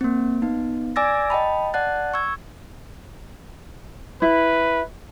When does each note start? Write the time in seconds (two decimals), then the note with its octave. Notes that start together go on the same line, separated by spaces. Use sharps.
0.01 A#3 C4
0.42 B3 D#4
0.96 D5 G#5 D6 E6 A6 A#6
1.30 D#5 G5 A5 B5
1.74 D5 F#5 A5 F#6 A6
2.14 C#6 E6 G#6
4.22 E4 B4